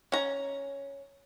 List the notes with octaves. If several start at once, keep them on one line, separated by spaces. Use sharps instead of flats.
C#4 A#5